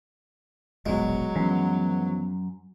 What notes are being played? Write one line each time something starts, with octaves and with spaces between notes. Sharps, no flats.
E1 A#1 F#3 G#3 B3
F#2 E3 F3 B3